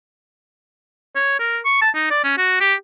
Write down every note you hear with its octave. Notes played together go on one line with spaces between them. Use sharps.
C#5
A#4
C#6
A5
D#4
D5
C#4
F#4
G4